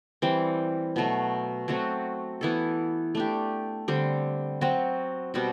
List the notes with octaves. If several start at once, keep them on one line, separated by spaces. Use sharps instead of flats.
E3 G3 C4
B2 F#3 A3
F#3 A3 C4 F#4
E3 B3 E4 A4
A3 D4 G4
D3 G3 C4
F#3 C4 F#4
B2 G3 C4 F#4